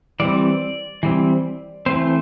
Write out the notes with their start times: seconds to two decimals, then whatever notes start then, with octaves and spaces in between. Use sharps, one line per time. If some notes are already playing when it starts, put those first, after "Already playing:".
0.20 E3 G3 C4 D5
1.03 E3 G3 C4
1.86 E3 A3 C4 C5